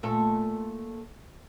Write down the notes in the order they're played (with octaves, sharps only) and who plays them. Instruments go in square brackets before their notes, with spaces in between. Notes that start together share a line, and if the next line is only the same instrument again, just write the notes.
[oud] A#2 A3 A4